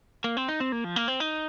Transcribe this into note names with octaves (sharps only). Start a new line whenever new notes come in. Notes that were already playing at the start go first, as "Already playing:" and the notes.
A#3
C4
D#4
C4
A#3
F3
A#3
C4
D#4